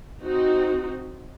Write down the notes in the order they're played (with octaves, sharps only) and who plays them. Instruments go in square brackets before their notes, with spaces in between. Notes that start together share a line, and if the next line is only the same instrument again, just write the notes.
[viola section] C4 D#4 F#4